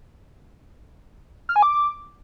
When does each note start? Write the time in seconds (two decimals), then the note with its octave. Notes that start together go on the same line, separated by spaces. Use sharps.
1.49 F6
1.56 G#5
1.63 D6